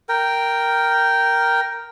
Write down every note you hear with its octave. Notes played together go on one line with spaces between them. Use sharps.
A#4 G5